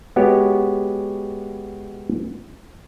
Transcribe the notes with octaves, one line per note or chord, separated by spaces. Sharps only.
G#3 B3 F#4 G4 C#5